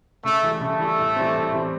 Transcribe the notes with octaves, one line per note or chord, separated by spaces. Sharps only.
C#3 A3
E3 G3
C#3 A3
E3 G3
A2
E3 G3 C4
A2
E3 G3 C4